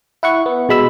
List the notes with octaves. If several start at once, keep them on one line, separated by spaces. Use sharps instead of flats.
E4 F#5 C#6
B3
B2 G#3 B5 E6